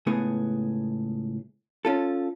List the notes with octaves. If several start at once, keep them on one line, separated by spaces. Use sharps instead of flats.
C#2 A2 B3 G#4
C#4 F4 A4